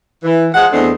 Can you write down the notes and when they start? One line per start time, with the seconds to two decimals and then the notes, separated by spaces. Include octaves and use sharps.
0.24 E3
0.53 F3 G#3 F#5
0.72 E2 A3 C4 D4 D#5